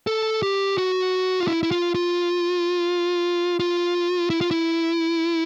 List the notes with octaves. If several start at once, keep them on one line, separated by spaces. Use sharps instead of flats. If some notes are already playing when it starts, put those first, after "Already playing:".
A4
G4
F#4
F4
E4
E4
F4
F4
F4
E4
F4
E4